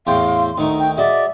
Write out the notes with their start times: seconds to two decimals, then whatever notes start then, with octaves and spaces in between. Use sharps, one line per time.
0.07 E2 A2 F5 G5 C6
0.58 D2 D#3 D#4 C#6
0.79 G5
0.98 G#3 F#4 D5 E5